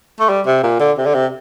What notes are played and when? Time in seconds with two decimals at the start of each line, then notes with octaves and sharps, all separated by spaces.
0.20 A3
0.29 G3
0.46 C3
0.63 A#2
0.80 D3
0.98 C3
1.06 D3
1.14 C3